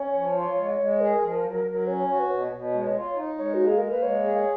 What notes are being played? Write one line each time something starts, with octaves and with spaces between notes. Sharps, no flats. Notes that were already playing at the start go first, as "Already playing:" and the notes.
Already playing: C#4 C#5
F3
F4
G#3
G#3
G#4 A#4
F3
F#3
F#3
C#4 C#5
C#5
F#4 C#5
B4
B2 C#5
B2
G#3
F4
D#4
G#3 C#5
A#3 F#4
G#4
A#3 A#4
B4
G#3 C#5
G#4